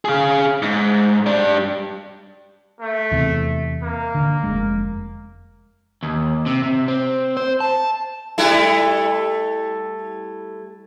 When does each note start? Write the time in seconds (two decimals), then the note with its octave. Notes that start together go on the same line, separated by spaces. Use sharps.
0.05 G#4 F5
0.62 G#2
1.26 G3 D4
2.80 A3
3.12 E2 C3
3.83 A#3
4.15 D3
4.44 F1 G#3
6.03 D#2
6.46 C3
6.63 C3
6.88 C4
7.37 C5
7.60 A5
8.38 G3 A3 E4